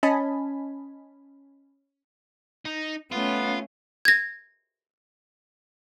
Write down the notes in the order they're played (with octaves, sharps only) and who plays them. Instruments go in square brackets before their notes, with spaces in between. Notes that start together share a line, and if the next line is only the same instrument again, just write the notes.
[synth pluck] C#4 D#5 G#5 A5 B5
[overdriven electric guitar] D#4
[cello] A3 C#4 [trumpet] B3 [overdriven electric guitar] F4
[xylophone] G#6 A#6